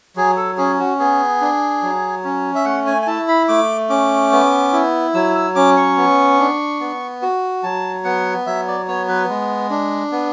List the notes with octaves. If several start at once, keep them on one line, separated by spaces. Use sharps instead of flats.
F#3 G#4
A4
C#4 G#4
F#4
B3 G#4
D4
F#3
C#4
E5
A3 F#5
G#5
G#5
E4 A5
B5
A3 D6
C#4 D6
B3
E4
F#3 E6
E6
C#4 D6
C#6
B3
D4
B3
F#4
F#3 A5
B3 F#5
F#3 E5
D5
B3 C#5
B4
G#3
D4
B3